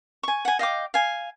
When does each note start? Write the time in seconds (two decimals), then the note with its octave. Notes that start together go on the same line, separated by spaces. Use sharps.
0.23 G#5 C#6
0.45 F#5 G#5
0.59 D#5 F5 G5 D6
0.94 F5 G#5